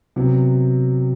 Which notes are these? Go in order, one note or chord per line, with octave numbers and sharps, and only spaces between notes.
C3 F#3 B3